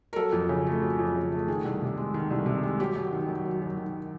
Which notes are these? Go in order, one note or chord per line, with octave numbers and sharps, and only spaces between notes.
A#4
F#3 A4
F2
C#3
A3
F#3
F2
C#3
A3
D#3 G#4
C2
C3
G#3
D#3
C2
C3
G#3
F#3 G4
F#2
D#3
F#2
F#3
F#2
D#3